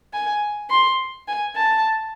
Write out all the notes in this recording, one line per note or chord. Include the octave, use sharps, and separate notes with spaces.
G#5
C6
G#5
A5